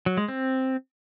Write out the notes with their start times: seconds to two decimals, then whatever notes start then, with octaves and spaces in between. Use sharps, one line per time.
0.06 F#3
0.17 G#3
0.28 C4